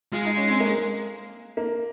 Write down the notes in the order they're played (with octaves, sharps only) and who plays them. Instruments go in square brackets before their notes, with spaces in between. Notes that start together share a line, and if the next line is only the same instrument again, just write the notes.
[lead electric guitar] G#3 [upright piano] F4
[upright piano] D#4
C#4
C4
A#3
A#3